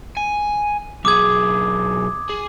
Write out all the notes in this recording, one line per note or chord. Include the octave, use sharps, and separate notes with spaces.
G#5
B1 G#4 D6 D#6 G#6
G#4